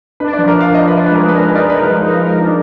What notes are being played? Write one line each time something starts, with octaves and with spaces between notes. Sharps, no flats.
D4 B4
D5
F3
A#4
D4 F5
F3 D#5
B4
D4
B4
G#3 A#4
A#4 B4
B4
D#4
D5
D#4
B4
A#4
F3 B4
D#4
A#4
D4